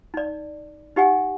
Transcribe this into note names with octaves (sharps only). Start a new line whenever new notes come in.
D#4 D5
D#4 G4 F#5 G#5